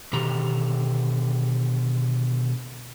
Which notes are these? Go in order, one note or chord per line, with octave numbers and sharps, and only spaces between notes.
B2 D3 D#3 G4 C5 A#5